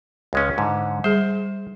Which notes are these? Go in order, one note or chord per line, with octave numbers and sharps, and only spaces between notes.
C#2 G#3 C#4
G#2 D3
G3 G#4 C5